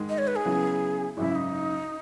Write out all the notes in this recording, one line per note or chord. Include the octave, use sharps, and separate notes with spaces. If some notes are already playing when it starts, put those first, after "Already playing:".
Already playing: G#2 D#3 G#3
D#5
C#5
B4
G#4
C#3 F#3 B3 E4
G#1 F#2 C#3 E4
D#4